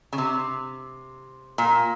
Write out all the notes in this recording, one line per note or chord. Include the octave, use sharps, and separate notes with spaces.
C#3
C3
A#2